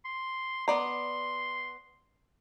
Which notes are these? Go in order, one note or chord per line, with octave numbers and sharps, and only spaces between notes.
C6
B3 D5 A#5 C6